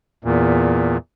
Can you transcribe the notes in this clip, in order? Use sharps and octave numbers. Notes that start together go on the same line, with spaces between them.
E2 A#2